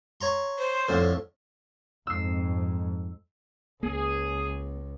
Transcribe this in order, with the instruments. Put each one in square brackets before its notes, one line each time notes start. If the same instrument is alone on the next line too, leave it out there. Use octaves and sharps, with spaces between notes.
[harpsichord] C#5 A#5 C6
[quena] C5
[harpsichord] F2 A2 D3
[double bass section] F2 G#2 [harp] E6 C7
[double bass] C#2 [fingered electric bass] A#3 [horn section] G#4